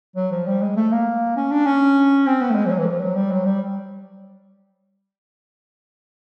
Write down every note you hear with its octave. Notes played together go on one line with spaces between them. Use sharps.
F#3
F3
G3
G#3
A3
A#3
C#4
D4
C#4
C4
B3
A3
G#3
F3
F#3
E3
F3
F#3
G3
F#3
G3